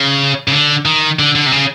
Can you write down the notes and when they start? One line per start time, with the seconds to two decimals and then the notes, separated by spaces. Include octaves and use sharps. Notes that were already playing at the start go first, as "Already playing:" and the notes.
Already playing: C#3
0.48 C#3
0.52 D3
0.85 D#3
1.19 D3
1.35 D3
1.46 C3
1.52 C#3